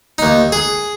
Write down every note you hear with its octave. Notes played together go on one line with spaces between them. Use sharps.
D#2 D#4
G#4